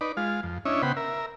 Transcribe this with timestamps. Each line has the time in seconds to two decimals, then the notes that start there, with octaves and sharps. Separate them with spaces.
0.01 D#4 B4 D5
0.17 G#3 F4 F5
0.43 F2
0.65 C#4 D4 E4 C#5 D#5 E5
0.82 C#3 B3 C5 F#5 G5 B5
0.97 A#4 E5